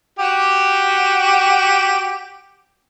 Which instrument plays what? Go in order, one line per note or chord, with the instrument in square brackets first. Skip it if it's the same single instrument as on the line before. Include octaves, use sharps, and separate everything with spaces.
[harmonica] F#4 G4